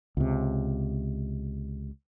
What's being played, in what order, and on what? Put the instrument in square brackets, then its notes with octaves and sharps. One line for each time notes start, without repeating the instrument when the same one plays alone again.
[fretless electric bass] C#2 C3